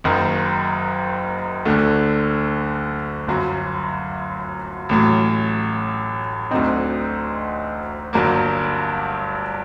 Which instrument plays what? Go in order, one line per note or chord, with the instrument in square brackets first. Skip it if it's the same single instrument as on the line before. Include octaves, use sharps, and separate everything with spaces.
[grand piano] F#1 F#2 D#3
D2 D3 A3
G1 F#2 F#3
A1 A2 F#3
D2 D3 F#3 C4 D#4
G1 G2 F#3 A#3